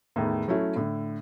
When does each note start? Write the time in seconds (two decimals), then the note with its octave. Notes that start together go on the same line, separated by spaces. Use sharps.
0.16 E2 A2 D#3
0.48 F#3 A3 C#4 E4
0.76 A2 D3